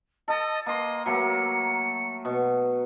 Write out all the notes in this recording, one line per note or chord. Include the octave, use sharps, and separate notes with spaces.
A4 D#5 A5
A#3 D#5 C6
F#3 A3 A#3 C#7
B2